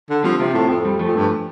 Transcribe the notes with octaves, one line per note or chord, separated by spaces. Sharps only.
D3
F3 G3 C4
C3 C4 F4
A2
F2
G3
F3 A3
F2
G2